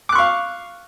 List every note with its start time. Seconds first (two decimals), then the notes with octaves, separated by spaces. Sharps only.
0.09 D6
0.12 F#6
0.15 C#6
0.18 F5